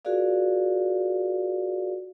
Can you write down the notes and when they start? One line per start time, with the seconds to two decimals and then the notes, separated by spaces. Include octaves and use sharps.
0.05 F4 F#4 G#4 A#4 D5 F5